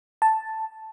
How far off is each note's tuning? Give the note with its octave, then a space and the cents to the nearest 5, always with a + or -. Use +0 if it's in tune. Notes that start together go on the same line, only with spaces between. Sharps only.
A5 +0